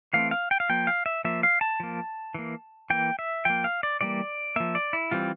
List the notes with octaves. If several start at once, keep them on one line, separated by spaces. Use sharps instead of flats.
E3 A3 C4 F5
F5
G5
F5
F3 A#3 G5
F5
E5
F3 A#3 E5
F5
A5
F3 A#3
E3 A#3
E3 A#3 G5
E5
F3 A#3 G5
F5
D5
E3 G3 A#3 D5
F3 A#3 E5
D5
E4
E3 G3 C4 F4